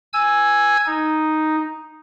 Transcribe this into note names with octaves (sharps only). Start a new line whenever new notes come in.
G#5 E6 G#6
D#4